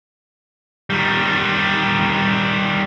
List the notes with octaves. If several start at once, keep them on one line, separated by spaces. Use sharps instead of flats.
D#3 G3